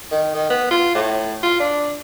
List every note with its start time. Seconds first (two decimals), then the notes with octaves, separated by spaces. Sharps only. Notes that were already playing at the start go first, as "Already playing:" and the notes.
0.11 D#3
0.34 D#3
0.50 B3
0.71 F4
0.95 A2
1.43 F4
1.60 D4